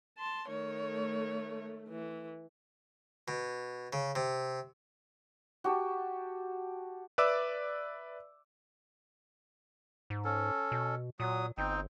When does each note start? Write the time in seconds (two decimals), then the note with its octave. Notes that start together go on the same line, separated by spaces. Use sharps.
0.18 A5 C6
0.48 D#3 A3 C#5
1.89 E3
3.28 B2
3.93 C#3
4.15 C3
5.64 F#4 G4 A5
7.18 B4 D5 E5 D6 E6
10.10 G#2
10.25 C#4 A4
10.72 B2
11.20 A#2 F#3 D#6
11.58 G1 C4 D#4 G5